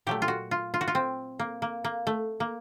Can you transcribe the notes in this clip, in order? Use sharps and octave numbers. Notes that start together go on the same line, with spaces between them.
A#2 F#3 A3 G4
F4
F#4
F4
F4
F#4
F4
C4
A#3
A#3
A#3
A3
A#3